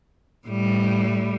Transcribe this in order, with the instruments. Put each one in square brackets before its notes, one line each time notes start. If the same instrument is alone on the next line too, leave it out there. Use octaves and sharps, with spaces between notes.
[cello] A2 G3